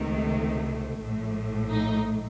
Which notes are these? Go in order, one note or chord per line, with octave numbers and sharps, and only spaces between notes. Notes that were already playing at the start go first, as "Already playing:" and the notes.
Already playing: C#2 C3 D#3 A3
A#1 A2 A3
D#4